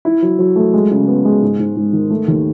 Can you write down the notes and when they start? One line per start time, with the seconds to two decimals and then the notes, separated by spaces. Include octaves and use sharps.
0.05 E4
0.22 F#3
0.39 F#3
0.56 A3
0.74 G#3
0.91 C#3
1.08 B3
1.25 G#3
1.42 G#2
1.59 G#2
1.76 G#2
1.93 D#3
2.10 A3
2.28 D#2